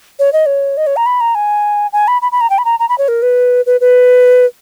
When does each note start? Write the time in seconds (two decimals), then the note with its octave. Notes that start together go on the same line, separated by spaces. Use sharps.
0.19 C#5
0.33 D#5
0.46 C#5
0.77 D#5
0.86 C#5
0.96 A#5
1.06 B5
1.20 A#5
1.35 G#5
1.93 G#5
2.07 B5
2.22 B5
2.32 B5
2.41 A#5
2.50 G5
2.58 B5
2.65 A#5
2.79 A#5
2.89 B5
2.98 C#5
3.08 A#4
3.22 B4
3.66 B4
3.81 B4